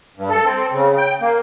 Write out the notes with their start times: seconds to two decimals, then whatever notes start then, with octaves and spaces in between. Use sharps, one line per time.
0.17 G2
0.30 A4
0.45 C4
0.72 C#3
0.97 G5
1.21 A#3